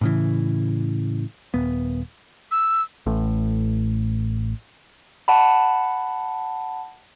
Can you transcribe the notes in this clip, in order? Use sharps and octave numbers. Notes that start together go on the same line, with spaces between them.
A2 C#3 E3
D#1 B3
E6
A1 A2
F#5 A5 B5